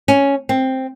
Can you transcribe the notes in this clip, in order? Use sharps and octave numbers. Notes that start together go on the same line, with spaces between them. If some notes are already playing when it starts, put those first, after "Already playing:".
C#4
C4